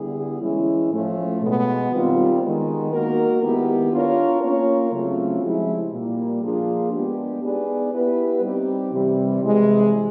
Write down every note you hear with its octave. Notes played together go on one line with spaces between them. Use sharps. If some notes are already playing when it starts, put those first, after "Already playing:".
Already playing: D3 G3 B3 E4 G#4
E3 G#3 C#4 E4
A2 F3 A3 C#4 F4
B2 G#3 B3
D#3 G3 C4 F4
D#3 G#3 B3
A#3 D#4 F#4 A#4
D#3 G#3 B3 E4 G4
B3 D4 F4 A#4 C#5
A#3 C#4 F4 A#4 C#5
C#3 F#3 A3 C4 F4
F3 G#3 C4 E4 G4
A#2 G3 A#3
F3 A#3 D4 F4 G#4
G#3 B3 D4 G4
B3 D#4 G#4 B4 D5
B3 E4 G4 B4
G3 C4 D#4 G4
C3 E3 G3 C4
C3 E3 G#3